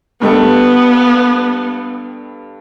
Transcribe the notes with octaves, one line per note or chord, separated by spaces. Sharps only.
G2 G3 B3 A4